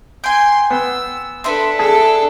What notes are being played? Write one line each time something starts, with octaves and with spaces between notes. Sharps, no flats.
G5 G#5 C6
B3 E6
D4 A4 B4 E5 C6
D4 G#4 A4 A5